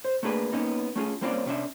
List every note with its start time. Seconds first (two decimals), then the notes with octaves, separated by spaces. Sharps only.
0.05 C5
0.23 A3 A#3 D4 G#4 B4
0.53 A#3 B3 C#4 D#4
0.96 A3 C#4 F4 G#4
1.21 G3 A#3 C4 C#4 F4 D5
1.46 C3 C#4 D4 E5